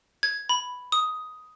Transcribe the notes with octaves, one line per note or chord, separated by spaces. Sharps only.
G#6
B5
D#6